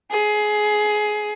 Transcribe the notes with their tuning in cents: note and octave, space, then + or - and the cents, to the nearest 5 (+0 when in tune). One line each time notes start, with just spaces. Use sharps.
G#4 +20